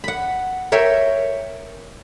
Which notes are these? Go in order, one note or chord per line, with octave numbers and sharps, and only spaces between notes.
F#5 B5
A#4 C#5 E5 G5